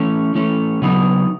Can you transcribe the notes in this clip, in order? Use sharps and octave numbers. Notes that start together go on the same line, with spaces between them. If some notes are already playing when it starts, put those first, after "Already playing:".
Already playing: E3 A3 C#4
E3 A3 C#4
C#3 F#3 B3 D#4